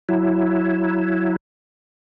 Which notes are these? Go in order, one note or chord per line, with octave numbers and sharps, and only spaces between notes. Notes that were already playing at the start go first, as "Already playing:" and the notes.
F#3 E4